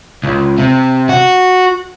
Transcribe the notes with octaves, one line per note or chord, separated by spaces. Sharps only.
C#2
C3
F#4